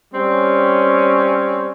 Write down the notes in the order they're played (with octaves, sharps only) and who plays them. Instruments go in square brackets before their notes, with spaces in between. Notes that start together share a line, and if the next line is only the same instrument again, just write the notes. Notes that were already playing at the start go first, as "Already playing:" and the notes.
[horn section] G3 C4 C#4